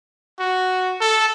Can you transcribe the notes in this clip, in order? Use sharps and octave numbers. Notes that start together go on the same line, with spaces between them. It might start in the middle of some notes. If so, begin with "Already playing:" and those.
F#4
A4